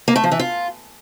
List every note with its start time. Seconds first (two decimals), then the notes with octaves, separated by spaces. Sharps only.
0.08 A#3
0.16 A3
0.24 F3
0.32 E3
0.39 F4